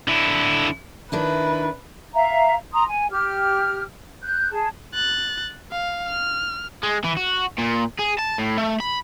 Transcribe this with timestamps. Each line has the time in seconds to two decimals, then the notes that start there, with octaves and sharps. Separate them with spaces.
0.08 D3 E4
1.12 D#3 D4 E4 B4
2.14 E5 F5 A#5
2.72 A#5 C6 D#6
2.88 G#5
3.11 G4 F6
4.22 F#6 G6
4.51 G#4 A5
4.94 F#6 A6
5.72 F5
6.07 F6
6.83 G#3
7.04 E3
7.17 F#4
7.58 A#2
7.99 G#4
8.18 A5
8.38 A2
8.57 A3
8.80 B5